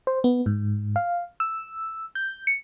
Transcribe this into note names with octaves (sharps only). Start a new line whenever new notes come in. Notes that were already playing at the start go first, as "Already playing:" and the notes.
C5
B3
G#2
F5
E6
G6
C#7